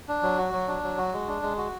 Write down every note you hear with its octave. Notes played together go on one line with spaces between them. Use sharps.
D4
F#3
F#4
F#3
D4
F#3
F#4
G#3
D4
G#3
F#4